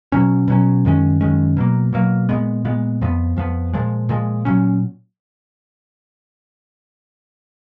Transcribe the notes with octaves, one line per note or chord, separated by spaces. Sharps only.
B2 F#3 C#4
B2 F#3 C#4
F#2 D#3 G#3 C#4
F#2 D#3 G#3 C#4
B2 F#3 A#3
B2 F#3 A#3
A#2 G#3 B3
A#2 G#3 B3
F2 F3 G#3 B3
F2 F3 G#3 B3
A#2 F3 G#3
A#2 F3 G#3
A#2 F#3 C#4